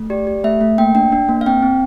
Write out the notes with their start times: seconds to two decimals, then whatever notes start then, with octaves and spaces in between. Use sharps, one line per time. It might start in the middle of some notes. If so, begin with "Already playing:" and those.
Already playing: A3
0.10 G4 D5
0.27 G4
0.44 A3 E5
0.61 A3
0.78 A#3 G5
0.95 D4 G5
1.12 D4
1.28 A#3
1.41 F5
1.46 C4 G5
1.62 C4